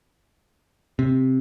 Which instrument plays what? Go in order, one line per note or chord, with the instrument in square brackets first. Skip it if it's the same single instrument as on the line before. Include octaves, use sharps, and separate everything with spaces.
[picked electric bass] C3